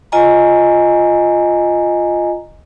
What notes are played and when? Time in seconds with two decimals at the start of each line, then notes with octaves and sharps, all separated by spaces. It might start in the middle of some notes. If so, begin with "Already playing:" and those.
0.12 F4 D#5 G#5 A#5